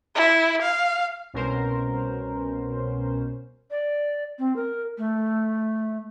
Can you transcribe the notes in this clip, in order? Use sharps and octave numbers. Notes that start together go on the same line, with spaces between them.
E4
F5
C2 B2 C#4 A#4 C5
D5
C4
A#4
A3